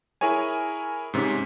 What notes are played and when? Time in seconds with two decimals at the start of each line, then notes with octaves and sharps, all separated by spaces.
0.21 E4 G#4 A#4 C#5 G#5
1.14 G#2 C3 C#4